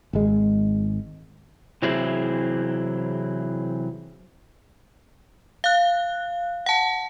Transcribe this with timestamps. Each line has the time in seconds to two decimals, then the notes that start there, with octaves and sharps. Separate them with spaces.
0.13 G#1 G#3
1.82 C3 E3 F#3 C4 E4 G#4
5.64 F5 F#6
6.66 F#5 A5